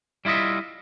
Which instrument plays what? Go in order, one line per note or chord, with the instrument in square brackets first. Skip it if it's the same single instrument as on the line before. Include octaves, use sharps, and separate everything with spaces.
[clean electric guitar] G3 E4 F4 D#5 E5